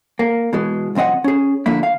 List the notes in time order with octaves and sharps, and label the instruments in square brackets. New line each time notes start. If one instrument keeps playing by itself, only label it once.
[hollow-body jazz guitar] A#3
B2 E3 G#3
C2 F2 C4 D#5 F#5
C#4 G#4
D3 F3 A#3 E4
F5